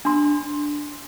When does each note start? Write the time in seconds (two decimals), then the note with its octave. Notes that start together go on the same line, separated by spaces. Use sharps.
0.05 D4 C6